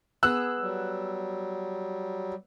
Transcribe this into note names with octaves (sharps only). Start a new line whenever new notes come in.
B3 G#4 E6 F#6
F#3 G3